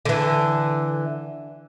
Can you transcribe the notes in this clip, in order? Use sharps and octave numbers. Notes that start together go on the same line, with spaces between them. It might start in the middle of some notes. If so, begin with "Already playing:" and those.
D3 E3